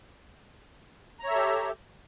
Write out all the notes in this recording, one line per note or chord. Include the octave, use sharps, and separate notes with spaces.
G4 A4 C#5 E5 A#5